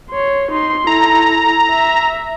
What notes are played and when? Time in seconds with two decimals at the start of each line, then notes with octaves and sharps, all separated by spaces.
0.11 C#5 C6
0.52 D#4 C6
0.87 E4 A4 A#5
1.70 E5